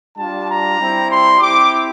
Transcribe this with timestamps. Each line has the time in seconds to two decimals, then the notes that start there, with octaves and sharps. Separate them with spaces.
0.18 G3 D4 F4 A5
0.49 A#5
0.79 G3 C4 E4
1.09 C6
1.40 C4 E4 G4 D6